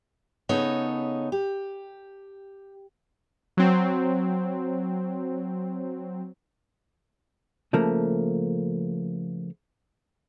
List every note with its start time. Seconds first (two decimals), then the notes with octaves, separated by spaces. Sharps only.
0.49 C#3 B3 D#4 A4 C#5
1.32 G4
3.57 F#3 C4
7.73 C#3 F3 A3 A#3